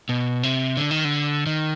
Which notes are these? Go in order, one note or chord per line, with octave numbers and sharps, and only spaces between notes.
B2
C3
D3
D#3
D3
D#3